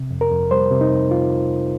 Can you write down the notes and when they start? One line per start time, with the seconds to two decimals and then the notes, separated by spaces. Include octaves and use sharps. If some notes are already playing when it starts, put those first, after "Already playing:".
Already playing: C3
0.11 F2
0.21 A#4
0.31 F2
0.51 G3 C5
0.71 C3
0.81 D#4
0.91 F2
1.11 F4